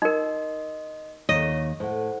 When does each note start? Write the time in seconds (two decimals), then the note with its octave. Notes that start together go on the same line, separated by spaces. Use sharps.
0.02 D#4 A#4 D#5 C6
1.29 D#2 C#5 D#5
1.80 A2 C5 F#5